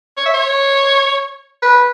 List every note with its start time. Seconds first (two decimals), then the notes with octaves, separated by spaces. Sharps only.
0.17 C#5
0.25 E5
0.34 C#5
1.62 B4